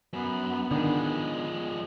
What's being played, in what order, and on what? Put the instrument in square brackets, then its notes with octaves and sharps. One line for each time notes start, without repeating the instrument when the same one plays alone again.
[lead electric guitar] F#2 [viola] B3
[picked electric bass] D3 D#3 [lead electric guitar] F3 G#3